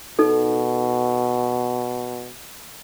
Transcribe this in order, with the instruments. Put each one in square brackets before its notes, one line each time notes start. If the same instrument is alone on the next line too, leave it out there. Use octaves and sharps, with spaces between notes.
[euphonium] B2 [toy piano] D#4 A4